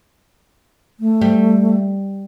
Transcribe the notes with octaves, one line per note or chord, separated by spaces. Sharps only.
A3
G3